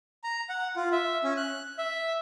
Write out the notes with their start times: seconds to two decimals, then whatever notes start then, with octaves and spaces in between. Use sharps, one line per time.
0.24 A#5
0.49 F#5
0.76 F4
0.92 E5
1.23 C#4
1.37 F#6
1.78 E5